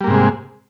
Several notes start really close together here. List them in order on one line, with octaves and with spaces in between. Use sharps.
G3 A#3 G#2 C3 G#3